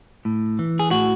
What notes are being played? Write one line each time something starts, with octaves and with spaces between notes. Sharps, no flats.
A2
E3
G#4
A2 F#4